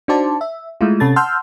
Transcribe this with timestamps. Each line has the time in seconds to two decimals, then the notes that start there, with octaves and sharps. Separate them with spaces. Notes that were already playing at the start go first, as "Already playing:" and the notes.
0.08 D4 D#4 F#4 C5 D5 A5
0.41 E5
0.81 G#3 A3 E4 F4
1.00 C3 C#4 A4 A6
1.16 F#5 A5 C6 E6 F6 G6